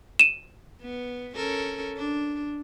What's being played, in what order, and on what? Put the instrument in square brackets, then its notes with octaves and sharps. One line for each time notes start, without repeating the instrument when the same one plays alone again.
[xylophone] D#7 E7
[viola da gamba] B3
C#4 A4 A#4
D4